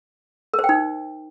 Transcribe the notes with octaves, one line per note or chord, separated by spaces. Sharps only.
A#4
C5
G5
D#4